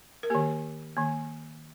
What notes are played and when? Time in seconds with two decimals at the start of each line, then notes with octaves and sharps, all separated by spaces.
0.23 A#4
0.30 D#3 A#3 G4
0.97 D#3 A#3